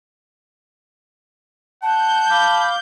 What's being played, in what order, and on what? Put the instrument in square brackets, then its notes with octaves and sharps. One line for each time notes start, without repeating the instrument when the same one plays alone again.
[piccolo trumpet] F#5 [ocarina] A5 [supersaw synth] G6
[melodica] F5 D6 [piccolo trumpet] B5